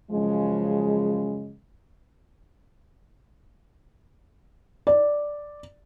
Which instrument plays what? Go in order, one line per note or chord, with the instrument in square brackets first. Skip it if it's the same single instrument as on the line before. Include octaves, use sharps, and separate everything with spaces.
[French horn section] F#2 C#3 F3 G#3
[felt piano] D5